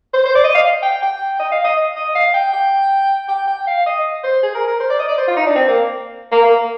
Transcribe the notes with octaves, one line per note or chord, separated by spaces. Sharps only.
C5
C5
D5
D#5
F5
G5
G5
D#5
F5
D#5
D#5
F5
G5
G5
G5
G5
F5
D#5
C5
G#4
A#4
A#4
C5
D5
D#5
D5
C5
F4
D#4
D4
C4
A#3
A#3
A#3